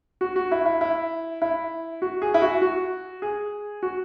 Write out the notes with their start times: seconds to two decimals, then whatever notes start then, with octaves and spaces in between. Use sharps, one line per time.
0.21 F#4
0.36 F#4
0.52 E4
0.66 E4
0.81 E4
1.42 E4
2.02 F#4
2.22 G#4
2.34 E4
2.42 F#4
2.62 F#4
3.22 G#4
3.83 F#4